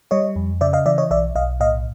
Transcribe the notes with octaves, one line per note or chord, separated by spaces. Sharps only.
G3 C#5 D#5
F2
C#3 D5 E5
D#5 F5
E3 D5 E5
C#5 D#5
B1 D5 E5
B1 D#5 F5
A2 D#5 F5